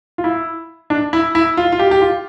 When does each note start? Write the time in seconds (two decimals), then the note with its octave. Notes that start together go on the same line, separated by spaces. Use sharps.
0.18 F4
0.24 E4
0.90 D4
1.13 E4
1.35 E4
1.57 F4
1.72 F4
1.79 G4
1.91 G4
2.02 F4